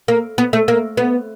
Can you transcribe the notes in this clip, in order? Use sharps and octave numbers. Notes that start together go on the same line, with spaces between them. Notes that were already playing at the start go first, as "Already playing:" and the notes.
A#3
B3
A3
A#3
B3